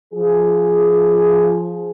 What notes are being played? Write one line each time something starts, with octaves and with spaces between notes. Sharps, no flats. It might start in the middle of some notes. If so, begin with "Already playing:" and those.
F3 G#4